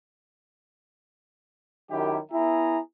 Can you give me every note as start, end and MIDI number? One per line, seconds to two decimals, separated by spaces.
1.90 2.17 42
1.90 2.17 51
1.90 2.17 64
1.90 2.17 67
2.31 2.78 59
2.31 2.78 64
2.31 2.78 68
2.31 2.78 76
2.31 2.78 82